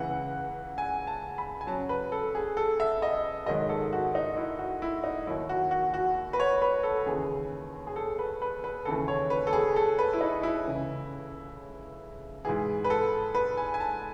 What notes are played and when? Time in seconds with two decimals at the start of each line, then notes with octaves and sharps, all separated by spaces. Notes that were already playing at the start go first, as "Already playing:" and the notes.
Already playing: C#2 C#3 E3 F#5
0.78 G#5
1.07 A5
1.38 B5
1.61 G#5
1.67 F#2 C#3 F#3 A5
1.89 B4
2.12 A4
2.35 G#4
2.57 A4
2.80 E5
3.02 D#5
3.46 G#2 D#3 F#3 D#5
3.69 A4
3.93 F#4
4.15 D#4
4.37 E4
4.59 F#4
4.82 E4
5.04 D#4
5.26 D#2 D#3 F#3 E4
5.49 F#4
5.71 F#4
5.94 F#4
6.33 B4
6.40 C#5
6.62 B4
6.83 A4
7.06 D#2 C#3 E3 G#4
7.87 G#4
7.96 A4
8.19 B4
8.42 B4
8.64 B4
8.85 D#2 C#3 E3 A4
9.08 C#5
9.30 B4
9.47 A4
9.53 G#4
9.76 A4
9.99 B4
10.13 E4
10.21 D#4
10.43 E4
10.65 C#2 C#3 E3
12.45 G#2 E3 G#4
12.84 B4
12.90 A4
13.35 B4
13.57 G#5
13.74 G#5
13.80 A5